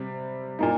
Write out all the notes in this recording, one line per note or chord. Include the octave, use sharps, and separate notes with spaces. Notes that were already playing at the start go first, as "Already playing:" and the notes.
Already playing: C3 G3 C4
A#2 A#3 D#4